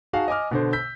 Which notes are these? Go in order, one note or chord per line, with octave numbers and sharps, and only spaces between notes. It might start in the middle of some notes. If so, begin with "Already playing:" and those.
D#4 F#4 G#4 F5 A5
D#5 G#5 D6 F6
B2 D3 C5
E6 G6 B6